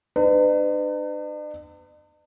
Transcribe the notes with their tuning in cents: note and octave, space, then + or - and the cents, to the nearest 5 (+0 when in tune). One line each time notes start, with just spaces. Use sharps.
D4 +45 B4 +40